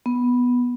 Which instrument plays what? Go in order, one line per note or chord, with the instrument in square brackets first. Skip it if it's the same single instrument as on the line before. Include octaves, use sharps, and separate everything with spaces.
[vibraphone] B3